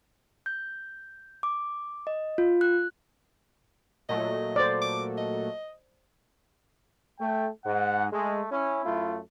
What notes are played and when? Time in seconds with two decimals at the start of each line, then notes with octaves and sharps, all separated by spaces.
0.46 G6
1.43 D6
2.07 D#5
2.38 F4
2.61 F#6
4.09 A#2 F#3 A3 D#5
4.56 C5 D5
4.81 D6
5.18 D#5
7.20 A3 G5
7.65 G#2 F#5
8.12 G#3 A3
8.52 C#4 E4
8.86 F#2 A3 F4